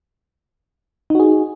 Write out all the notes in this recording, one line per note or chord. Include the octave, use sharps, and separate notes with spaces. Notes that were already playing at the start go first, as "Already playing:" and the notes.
D#4 F#4 G#4